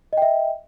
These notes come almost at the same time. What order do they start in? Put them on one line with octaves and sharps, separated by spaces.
D#5 G5 E5